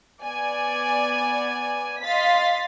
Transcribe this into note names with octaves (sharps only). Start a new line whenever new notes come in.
B3 D5 G#5
D#5 F5 C6 A6 B6